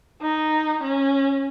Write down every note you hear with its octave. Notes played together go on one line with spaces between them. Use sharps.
D#4
C#4